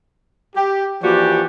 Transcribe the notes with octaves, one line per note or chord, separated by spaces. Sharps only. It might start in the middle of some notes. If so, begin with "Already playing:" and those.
G4
E3 F3 A#3 F#4 G4 D5